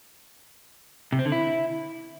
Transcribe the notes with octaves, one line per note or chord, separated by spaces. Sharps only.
C3
C4
D3
E4